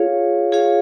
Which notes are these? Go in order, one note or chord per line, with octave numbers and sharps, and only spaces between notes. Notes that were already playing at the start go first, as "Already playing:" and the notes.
Already playing: F4 G#4 C#5 F5
F4 G#4 C#5 F5